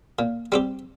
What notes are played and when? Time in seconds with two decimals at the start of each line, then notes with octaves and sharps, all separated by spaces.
0.19 A#2
0.52 G3 C4 G4